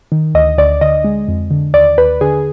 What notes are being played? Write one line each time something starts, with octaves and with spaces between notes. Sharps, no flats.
D#3
D2 D#5
D2 D5
D3 D#5
G#3
F2
D3
D#2 D5
D#2 B4
D3 G#4